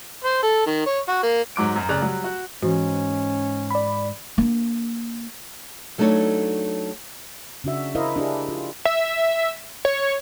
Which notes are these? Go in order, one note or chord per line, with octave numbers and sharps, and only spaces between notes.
C5
A4
D#3
C#5
F#4
A#3
G#2 F#3 D6 D7
F#2 A#5
D1 C#3 D5 A#5 F#6
F#3 G3
F#4
G#2 E3 C#4 F#4
D5 B5
A#3 D4
F#3 A3 D4 D#4 A4 C#5
C#3 D4 F#4 E5
E4 A#4 C5 D#5 F5
D4 E4 G4 G#4
F4
E5
C#5